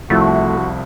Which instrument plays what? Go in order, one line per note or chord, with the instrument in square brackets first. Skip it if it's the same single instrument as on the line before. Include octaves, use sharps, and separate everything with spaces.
[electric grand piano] C2 F3 E4 [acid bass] A3 [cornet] F#4